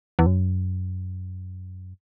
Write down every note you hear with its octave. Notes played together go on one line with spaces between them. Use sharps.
E2
F#2